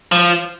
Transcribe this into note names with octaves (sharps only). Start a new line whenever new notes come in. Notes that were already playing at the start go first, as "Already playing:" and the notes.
F3